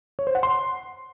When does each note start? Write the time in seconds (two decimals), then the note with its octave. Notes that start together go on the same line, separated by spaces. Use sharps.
0.19 C#5
0.27 C5
0.35 F#5
0.43 C6